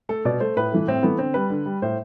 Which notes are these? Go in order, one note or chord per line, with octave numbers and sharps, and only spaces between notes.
A3 A4
B2 D5
A3 C5
A2 B4
E3 A3
A2 C4
E3 A3 B3
D3 C4
G3 B4
D3
G3
A2 C5